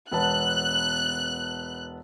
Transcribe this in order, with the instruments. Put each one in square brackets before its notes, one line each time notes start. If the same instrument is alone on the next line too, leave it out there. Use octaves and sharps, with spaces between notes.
[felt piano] E1 B3 A5 [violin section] F#6